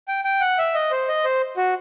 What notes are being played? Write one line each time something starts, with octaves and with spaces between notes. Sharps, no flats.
G5
G5
F#5
E5
D#5
C5
D#5
C5
F#4